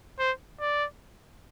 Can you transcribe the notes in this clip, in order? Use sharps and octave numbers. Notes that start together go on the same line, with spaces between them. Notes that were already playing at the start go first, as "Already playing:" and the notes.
C5
D5